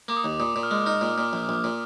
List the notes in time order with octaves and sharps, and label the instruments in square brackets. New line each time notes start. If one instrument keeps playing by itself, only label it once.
[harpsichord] A#3 [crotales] D6
[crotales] D#6
[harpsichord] D#2
[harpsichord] A#2 [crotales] D#6
[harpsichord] A#2
[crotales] F6
[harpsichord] G#3
[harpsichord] D#4 [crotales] F6
[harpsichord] A#2
A#2
A#1
A#1
A#2